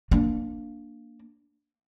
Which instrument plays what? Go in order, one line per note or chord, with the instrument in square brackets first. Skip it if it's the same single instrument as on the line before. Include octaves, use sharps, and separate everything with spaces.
[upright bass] A#3 D4